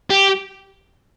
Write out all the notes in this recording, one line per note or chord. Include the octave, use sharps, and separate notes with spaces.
G4